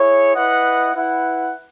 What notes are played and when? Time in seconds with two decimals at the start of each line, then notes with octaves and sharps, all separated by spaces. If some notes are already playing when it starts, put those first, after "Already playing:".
Already playing: E4 G#4 C#5
0.35 E4 B4 D#5 F#5
0.95 E4 B4 F#5